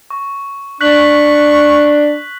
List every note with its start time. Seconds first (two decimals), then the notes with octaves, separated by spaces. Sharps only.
0.10 C#6
0.81 D4 C#6 F#6 B6 F#7